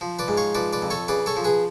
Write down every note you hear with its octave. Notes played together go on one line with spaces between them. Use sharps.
F3
B4 D5
G#2
C#5 F5
F3 B4 D5
B4 D5
F2
A4 C#5
C#3 B4 D5
A4 C#5
F3
G#4 B4